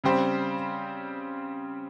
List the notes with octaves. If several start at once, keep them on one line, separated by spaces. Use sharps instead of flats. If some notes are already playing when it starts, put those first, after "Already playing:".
C#3 G3 C4 G4 C5